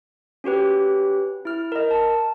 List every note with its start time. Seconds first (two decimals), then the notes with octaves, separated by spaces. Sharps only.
0.44 C#4 F#4 G4 B4
1.45 E4 F6
1.72 A#4 D#5
1.91 A5